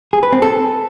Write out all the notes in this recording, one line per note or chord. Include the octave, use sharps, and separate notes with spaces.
G#4
B4
C4
A4